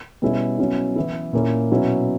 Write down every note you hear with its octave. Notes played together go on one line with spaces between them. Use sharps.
B2 G3 C#4 E4
B2 F#3 C#4 E4
E3 B3 E4
A#2 A#3 C#4 E4
B2 F#3 C#4 E4